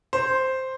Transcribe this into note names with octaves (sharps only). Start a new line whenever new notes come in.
C5